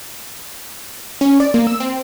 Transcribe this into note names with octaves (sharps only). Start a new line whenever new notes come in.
C#4
D5
A#3
E6
C4